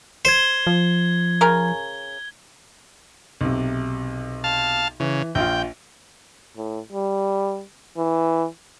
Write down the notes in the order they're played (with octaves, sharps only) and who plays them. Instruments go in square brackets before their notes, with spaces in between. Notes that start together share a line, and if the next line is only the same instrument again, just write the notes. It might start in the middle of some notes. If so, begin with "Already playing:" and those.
[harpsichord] C5 [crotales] G#6 G7
[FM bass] F3
[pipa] C#3 A#4 G#5
[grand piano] B1 C3
[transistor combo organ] F5 A5
[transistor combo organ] C#3 [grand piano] E3
[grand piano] A#1 F4 [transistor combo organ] G5
[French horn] A2
G3
E3